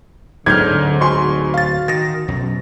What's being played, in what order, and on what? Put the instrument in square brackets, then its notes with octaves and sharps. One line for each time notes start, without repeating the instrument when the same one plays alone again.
[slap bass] D1 F#3 [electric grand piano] G#2 [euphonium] D3 [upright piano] F6 G6 G#6
[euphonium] F#4 [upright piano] G#5 C6 C#6
[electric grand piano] F5 A6
[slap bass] D#3 [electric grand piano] A6 A#6
[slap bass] B1 F#2